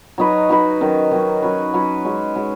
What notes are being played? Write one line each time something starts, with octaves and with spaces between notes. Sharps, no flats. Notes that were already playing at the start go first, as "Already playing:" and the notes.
F#3 D#4 F#4 B4
F#3 D#4 F#4 B4
D#3 F#3 C#4
D#3 F#3 C#4
F#3 C#4 F#4 B4
F#3 C#4 F#4 B4
G#3 C#4 F#4
G#3 C#4 F#4